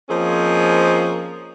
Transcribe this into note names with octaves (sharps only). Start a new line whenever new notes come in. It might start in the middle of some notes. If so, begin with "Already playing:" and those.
F3 A#3 C4 C#4 G#4 D#5